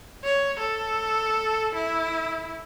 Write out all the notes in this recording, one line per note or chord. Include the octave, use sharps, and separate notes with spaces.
C#5
A4
E4